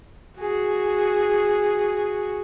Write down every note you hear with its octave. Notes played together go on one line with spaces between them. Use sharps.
F#4 G#4